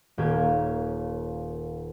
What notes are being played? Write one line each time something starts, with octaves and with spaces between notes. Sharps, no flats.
D#1 A#3 C#4 G4 G#6